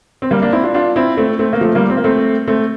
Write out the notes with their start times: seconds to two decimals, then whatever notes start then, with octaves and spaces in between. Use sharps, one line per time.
0.22 C4
0.31 G3 A#3
0.42 A#3 D4
0.52 C4 E4
0.63 D4 F4
0.74 D4 F4
0.96 C4 E4
1.17 A3 C4
1.39 A3 C4
1.53 A#3
1.61 F3 A3
1.75 G3 A#3
1.90 C4
1.97 A#3
2.04 A3 C4
2.48 A3 C4